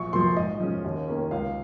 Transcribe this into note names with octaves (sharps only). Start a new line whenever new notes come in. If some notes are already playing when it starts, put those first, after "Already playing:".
Already playing: A#1 C#6
A#2 F3 C6
G#2 D#5
F3 G#3 C#4
D#2
D#3 A#3 C#4
C#2 F5